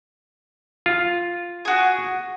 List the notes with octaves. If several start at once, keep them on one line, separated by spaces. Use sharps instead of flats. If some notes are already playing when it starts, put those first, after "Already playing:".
F4
F#4 G#4